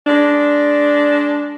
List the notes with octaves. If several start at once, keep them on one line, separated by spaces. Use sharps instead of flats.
G#3 D4